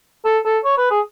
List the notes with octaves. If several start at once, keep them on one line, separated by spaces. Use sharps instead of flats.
A4
A4
C#5
B4
G#4